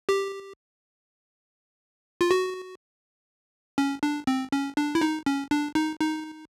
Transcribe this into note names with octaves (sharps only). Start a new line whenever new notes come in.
G4
F4
F#4
C#4
D4
C4
C#4
D4
E4
D#4
C#4
D4
D#4
D#4